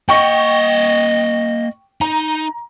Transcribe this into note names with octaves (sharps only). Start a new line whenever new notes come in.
A#3 D#5 F#5 G5 C#6
D#4 A#5